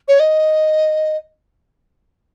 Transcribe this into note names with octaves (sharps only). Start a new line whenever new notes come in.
C#5
D#5